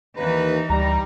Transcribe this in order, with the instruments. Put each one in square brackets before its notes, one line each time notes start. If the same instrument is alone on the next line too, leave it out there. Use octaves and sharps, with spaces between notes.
[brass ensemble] D#2 B4 [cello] E3 D#4
[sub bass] D2 [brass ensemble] G3 [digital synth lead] A#5